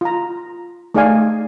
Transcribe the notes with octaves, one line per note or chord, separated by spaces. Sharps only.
F4 A#5
A3 D#4 G#4 D5 F5 G#5